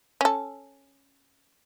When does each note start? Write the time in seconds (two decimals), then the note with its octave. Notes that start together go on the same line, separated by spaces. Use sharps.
0.21 C#4 A4